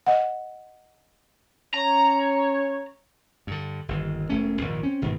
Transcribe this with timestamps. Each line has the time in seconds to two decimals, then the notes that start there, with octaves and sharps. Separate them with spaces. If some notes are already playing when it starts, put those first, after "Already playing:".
0.06 D#5 F#5
1.74 C#4 C#5 A#5
3.47 G2 D3
3.88 G1 D#2
4.29 E1 A3 C#4
4.61 A#1 D#2 G#2
4.83 C4 C#4
5.02 G1 G#2 B2 D#3